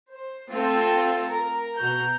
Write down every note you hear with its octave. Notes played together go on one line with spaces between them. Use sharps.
C5
A3 C4 F4 A4
A#4
B2 F#4 A#5 G6